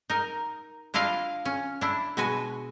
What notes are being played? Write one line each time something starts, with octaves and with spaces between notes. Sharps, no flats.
D#4 A#4
D4 E4 F4 D#5 F5
C#4
D4 E4
B2 G#3 F#4 B4 G#5